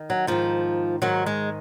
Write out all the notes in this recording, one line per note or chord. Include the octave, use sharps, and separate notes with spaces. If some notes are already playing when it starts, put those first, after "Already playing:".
Already playing: D#3
F#3
G#2 D#3 F3
G#2 D#3 F#3
G#3